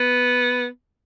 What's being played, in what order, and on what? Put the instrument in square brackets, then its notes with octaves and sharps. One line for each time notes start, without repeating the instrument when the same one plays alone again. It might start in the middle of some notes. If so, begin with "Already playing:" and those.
Already playing: [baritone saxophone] B3